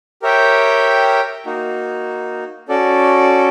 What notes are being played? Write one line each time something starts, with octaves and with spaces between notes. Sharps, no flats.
G4 A#4 C#5 E5 G5
A#3 D#4 F#4
C#4 F#4 A4 D5